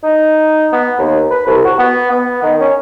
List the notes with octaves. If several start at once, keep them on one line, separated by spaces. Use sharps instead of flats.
D#4
B3
D#2
B4
C2
F#4
B3
B3
D#3
C#4